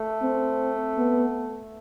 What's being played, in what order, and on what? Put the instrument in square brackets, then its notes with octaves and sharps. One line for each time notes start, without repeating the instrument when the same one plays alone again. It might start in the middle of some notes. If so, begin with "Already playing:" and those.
Already playing: [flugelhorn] A3
[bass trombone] C4
B3